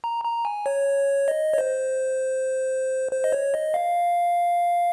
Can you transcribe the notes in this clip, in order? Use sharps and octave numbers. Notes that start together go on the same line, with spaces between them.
A#5
A#5
G#5
C#5
D#5
C#5
C5
C5
D#5
C#5
D#5
F5